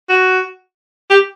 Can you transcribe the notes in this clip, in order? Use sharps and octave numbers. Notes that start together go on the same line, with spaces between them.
F#4
G4